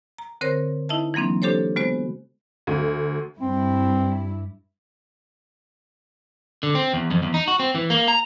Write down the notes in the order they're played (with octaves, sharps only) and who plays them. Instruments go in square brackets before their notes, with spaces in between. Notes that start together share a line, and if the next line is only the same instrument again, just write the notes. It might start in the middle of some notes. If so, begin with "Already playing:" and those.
[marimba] A#5
D3 C4 A#4 C5 C#5 A#6
D#4 E4 D#5 E5 A5
E3 F#3 A#3 C4 D4
D4 G4 A4 C5 C#5
C#3 G#3 B3 F#4 C5
[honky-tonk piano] D2
[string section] G2 E4 [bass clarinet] C4
[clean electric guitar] D3
C4
E2
F2
E2
D#4
F#4
C4
E3
A#3
A#5